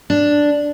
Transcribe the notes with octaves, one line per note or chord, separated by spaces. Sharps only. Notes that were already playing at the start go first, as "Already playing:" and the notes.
D4